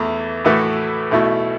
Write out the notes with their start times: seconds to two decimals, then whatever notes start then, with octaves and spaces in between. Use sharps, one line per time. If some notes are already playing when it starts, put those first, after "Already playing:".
Already playing: E2 E3 A3
0.45 A2 E3 A3 F#4 A4
1.11 B1 B2 A3 E4